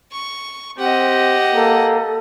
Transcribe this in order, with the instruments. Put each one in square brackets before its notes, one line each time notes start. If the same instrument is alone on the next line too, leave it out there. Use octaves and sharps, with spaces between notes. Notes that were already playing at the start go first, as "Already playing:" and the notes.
[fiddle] C#6
[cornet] C4 [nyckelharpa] G4 [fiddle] D#5 F#5
[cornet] A#3 [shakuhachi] A4